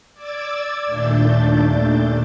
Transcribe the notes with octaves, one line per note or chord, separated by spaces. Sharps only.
D5 D6 E6 G#6 A6
D#2 A#2 A3 D4 G6 A6